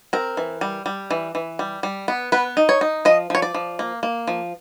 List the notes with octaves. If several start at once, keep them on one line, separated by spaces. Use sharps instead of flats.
C4 A#4
E3
G3
G3
E3
E3
G3
G3
B3
B3 B4
D#4
C#5
D#4
F3 D#5
F3 C#5
D5
F3
A#3
A#3
F3